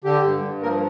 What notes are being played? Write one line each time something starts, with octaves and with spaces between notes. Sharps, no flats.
D3 G4
G2
G2
F3 A#3 A#4